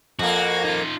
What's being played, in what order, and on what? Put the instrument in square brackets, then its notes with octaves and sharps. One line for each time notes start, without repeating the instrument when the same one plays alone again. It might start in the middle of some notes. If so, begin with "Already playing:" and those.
[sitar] F2 A#3 [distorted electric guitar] F#4
[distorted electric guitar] D#4 F4